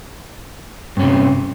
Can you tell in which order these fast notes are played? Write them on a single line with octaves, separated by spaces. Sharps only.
G2 C#4 C3